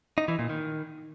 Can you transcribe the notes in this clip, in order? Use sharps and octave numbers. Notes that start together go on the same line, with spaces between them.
D#4
E3
A#2
D#3